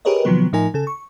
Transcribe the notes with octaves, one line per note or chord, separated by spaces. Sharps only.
G4 G#4 A#4 B4 C#5 D#5
C3 D#3 F3 F#3 B3 B4
A2 F3 D#4 A#4 G#5
C#3 A4
C#6